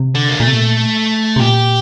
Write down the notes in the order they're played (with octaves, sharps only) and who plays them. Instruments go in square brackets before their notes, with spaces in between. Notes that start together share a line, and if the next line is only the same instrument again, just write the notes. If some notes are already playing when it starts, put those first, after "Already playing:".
Already playing: [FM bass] C3
[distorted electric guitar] D3
A#3
[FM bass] A#2 [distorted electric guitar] A3
[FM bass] C3
A#2
C3
[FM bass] A#2 [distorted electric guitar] G4